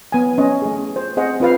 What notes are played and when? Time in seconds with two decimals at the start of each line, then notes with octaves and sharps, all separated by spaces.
0.12 B3 G#5
0.38 C#4 D#5
0.62 A3 G#4
0.96 C5
1.17 C4 G#4 C5 D#5 F#5
1.40 C4 F4 B4 F5